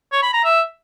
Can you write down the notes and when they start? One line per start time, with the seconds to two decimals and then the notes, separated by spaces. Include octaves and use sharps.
0.12 C#5
0.23 B5
0.33 A#5
0.44 E5